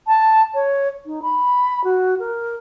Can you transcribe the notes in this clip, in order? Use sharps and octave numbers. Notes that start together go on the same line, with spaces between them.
A5
C#5
D#4
B5
F#4
A#4